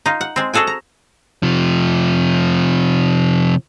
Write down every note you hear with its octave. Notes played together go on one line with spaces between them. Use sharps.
D#4 F4
F#5
G#3 C4
F#4 G#4 A4 F#5 G#5
A#5
C3 F3